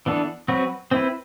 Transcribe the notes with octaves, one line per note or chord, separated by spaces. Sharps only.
E3 B3 D4 A4
F#3 C4 F#4 B4
C4 E4 B4